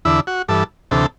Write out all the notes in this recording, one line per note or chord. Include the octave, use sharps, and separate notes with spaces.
E2 D3 E4
F#4
G2 E3 A4
D2 C3 E3 A4